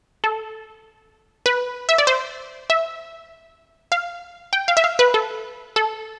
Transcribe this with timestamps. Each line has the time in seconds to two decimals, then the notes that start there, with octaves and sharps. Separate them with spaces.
0.24 A4
1.46 B4
1.89 E5
1.98 D5
2.07 C5
2.70 E5
3.92 F5
4.53 G5
4.68 F5
4.77 E5
4.84 F5
4.99 B4
5.14 A4
5.76 A4